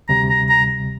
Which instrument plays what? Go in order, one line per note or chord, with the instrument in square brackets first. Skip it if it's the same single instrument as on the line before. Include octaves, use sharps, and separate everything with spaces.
[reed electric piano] D2 C3 G3 [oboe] A#5
[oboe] A#5
A#5